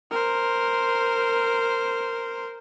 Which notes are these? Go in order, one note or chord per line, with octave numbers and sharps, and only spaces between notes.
A#4 C5